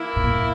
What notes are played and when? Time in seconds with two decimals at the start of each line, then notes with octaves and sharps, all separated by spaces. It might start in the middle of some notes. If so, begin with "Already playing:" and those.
Already playing: E3 A#3 E4
0.16 A2
0.23 A#2